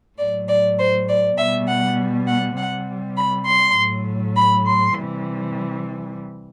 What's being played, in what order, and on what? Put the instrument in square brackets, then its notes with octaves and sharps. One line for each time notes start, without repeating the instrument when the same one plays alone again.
[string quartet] A2 F#3 D5
D5
C5
D5
B2 G3 E5
F#5
F#5
C3 G3 F#5
B5
C6
A2 F#3
B5
C6
C3 E3 G3